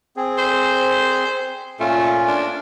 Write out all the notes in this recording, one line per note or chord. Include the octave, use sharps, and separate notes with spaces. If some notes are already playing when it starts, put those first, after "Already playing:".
C4 G#4
C5
A#2 A3 C#4 F4
D4